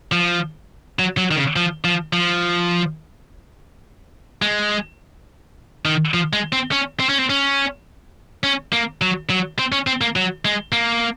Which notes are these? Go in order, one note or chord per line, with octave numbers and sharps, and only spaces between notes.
F3
F#3
F#3
D#3
C#3
F3
F3
F3
G#3
D#3
F3
G#3
C4
C#4
C4
C#4
C4
C#4
C#4
A#3
F#3
F#3
C4
C#4
C4
A#3
F#3
G#3
A#3